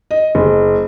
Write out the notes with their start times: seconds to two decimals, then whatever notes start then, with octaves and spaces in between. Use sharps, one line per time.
0.11 D#5
0.35 F#1